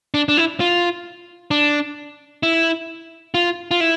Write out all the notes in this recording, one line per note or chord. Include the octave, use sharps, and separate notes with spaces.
D4
D4
E4
F4
D4
E4
F4
F4
E4